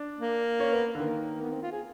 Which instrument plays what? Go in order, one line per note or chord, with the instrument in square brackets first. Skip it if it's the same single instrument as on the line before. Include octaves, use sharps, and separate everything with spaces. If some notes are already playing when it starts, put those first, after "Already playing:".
Already playing: [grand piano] D4
[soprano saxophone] A#3
[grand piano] C#4
B3
D3
[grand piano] D#3 [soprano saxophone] A#3
[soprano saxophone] B3
C4
F4
G#4